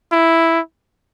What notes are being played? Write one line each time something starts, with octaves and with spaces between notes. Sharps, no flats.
E4